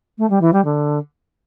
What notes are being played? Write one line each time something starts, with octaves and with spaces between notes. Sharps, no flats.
A3
G3
E3
G3
D3